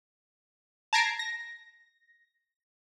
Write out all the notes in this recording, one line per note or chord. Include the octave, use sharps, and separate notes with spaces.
A5 A#5 G#6 A#6 C7 D7
A#6